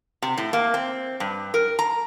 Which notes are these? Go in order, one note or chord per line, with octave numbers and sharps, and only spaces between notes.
C3
A2
A#3
C4
G2
A#4
A#5